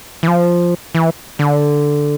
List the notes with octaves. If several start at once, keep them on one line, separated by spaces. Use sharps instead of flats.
E3
F3
E3
D3